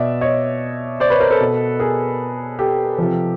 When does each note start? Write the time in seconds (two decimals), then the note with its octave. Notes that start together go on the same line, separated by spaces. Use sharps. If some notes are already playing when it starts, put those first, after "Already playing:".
Already playing: B2 D5 E5
0.21 C#5 D#5
1.00 C5 D5
1.10 B4 C#5
1.20 A#4 C5
1.31 A4 B4
1.41 B2
1.79 G#4 A#4
2.59 G4 A4
2.98 C3 F3